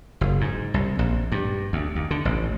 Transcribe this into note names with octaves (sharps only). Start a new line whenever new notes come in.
F#1
G#2
C2
A#1
G2
D2
D#2
D3
A1